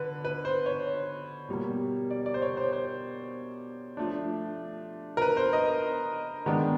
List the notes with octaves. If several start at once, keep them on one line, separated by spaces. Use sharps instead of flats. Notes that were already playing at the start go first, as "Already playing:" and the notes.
Already playing: D3 B4
B4
C5
C#5
B2 G3 A#3
D5
D5
C5
C#5
C5
C5
F3 A3 D4
A#4
B4
C5
D#5
D#3 G#3 B3 D4